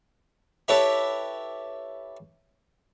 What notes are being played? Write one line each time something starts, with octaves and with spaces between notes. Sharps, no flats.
E4 G4 A4 B4 C#5 E5